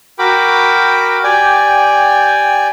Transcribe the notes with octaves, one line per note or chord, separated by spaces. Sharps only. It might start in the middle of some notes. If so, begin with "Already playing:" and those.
F#4 A#4 G5 B5 D6
G4 D5 G5 G#5